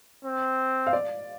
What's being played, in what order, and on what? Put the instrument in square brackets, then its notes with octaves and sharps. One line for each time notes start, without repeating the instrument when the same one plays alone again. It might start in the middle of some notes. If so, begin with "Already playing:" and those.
[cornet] C4
[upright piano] F5
D5